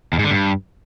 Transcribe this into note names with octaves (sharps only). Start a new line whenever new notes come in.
E2
G#2
D3
G2